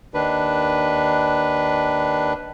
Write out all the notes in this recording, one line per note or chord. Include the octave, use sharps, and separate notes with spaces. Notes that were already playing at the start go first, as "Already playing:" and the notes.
D#2 D#3 D4 B4